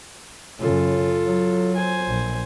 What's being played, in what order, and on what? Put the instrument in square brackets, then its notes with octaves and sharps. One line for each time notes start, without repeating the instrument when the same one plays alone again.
[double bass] F#2 C#3 [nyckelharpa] F4 A4
[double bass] F#3
[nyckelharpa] C5 G#5
[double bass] A#1